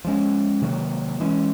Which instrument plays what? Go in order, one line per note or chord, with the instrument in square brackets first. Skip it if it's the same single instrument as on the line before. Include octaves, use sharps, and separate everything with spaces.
[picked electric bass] F3 G#3 C#4
C3 D#3 F#3 A#3
E3 G#3 C#4